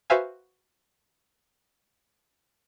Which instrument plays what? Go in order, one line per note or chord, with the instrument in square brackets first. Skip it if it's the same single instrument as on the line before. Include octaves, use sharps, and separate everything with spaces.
[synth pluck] F#4 B4 C5 E5 F5 G#5